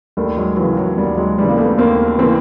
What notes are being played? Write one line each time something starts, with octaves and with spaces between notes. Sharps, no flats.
D#2 G3 A3
F#3 G#3
C#3 E3 F#3
F#3
D#2 G3
F#3 G#3
C#3 E3 G3
A#3
A3 B3
D#2 A#3 C4
C#3 E3 A#3 C4